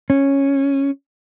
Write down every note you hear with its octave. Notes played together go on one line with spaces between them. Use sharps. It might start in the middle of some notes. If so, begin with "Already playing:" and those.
C#4